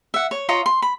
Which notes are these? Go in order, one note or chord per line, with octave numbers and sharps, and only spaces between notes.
E5 F#5
C#5
F4 C#5 D#5 A#5
C6
B5